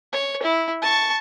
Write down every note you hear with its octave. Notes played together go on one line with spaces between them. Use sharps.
C#5
E4
A5 C#6